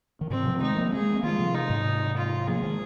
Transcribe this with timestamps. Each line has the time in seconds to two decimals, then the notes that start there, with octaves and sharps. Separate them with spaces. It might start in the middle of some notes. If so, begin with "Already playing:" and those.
0.21 D#3
0.30 G#2 C3 C4
0.45 C3 F3
0.61 D#3 G#3 D#4
0.77 F3 A#3
0.92 G#3 C4 G#4
1.15 A#3
1.23 D#3 G#3 F4
1.39 C3 F3
1.54 D#4
1.70 G#2 C3
2.17 F4
2.47 F3 A#3 G#4
2.63 D#3 G#3